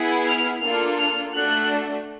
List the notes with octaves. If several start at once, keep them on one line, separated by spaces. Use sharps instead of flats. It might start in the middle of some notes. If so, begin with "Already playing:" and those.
Already playing: B3 E4 G#4
F6
A#3 D4 F4 A4 F6
F6
A3 D4 F#4 A4 F#6